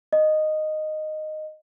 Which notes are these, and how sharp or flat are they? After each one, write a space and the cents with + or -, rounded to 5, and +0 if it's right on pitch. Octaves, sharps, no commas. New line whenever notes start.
D#5 -10